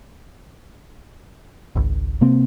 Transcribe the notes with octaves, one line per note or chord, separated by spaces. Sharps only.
G#1 C#2
C3 A#3 C4